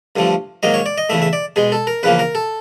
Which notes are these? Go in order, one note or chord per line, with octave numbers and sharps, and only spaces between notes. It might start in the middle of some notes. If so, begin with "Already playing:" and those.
G2 D3 F3 A3
G#2 D#3 F#3 A#3 D#5
C#5
D5
D#5
E2 C#3 E3 A3 E5
E5
D5
B2 G#3 G#4
A4
A#4
E2 C#3 F3 A#3 B4
A#4
A4